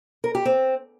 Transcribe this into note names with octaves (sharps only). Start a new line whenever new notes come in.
A#4
G4
C4